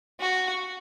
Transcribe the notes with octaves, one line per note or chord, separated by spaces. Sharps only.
F#4